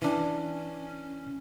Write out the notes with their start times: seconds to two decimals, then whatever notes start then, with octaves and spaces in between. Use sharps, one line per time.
0.02 E3 C#4 D4